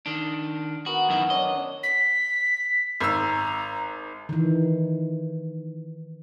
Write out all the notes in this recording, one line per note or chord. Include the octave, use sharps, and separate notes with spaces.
D#3 D4
B3 F#4 A#4
F#2 D#3 E4
C#4 D4 D#5
B6
G#1 A#5 E6
D#3 E3